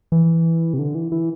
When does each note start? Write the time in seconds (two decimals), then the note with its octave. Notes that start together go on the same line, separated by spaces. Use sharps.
0.12 E3
0.73 C3
0.79 D3
0.95 E3
1.12 E3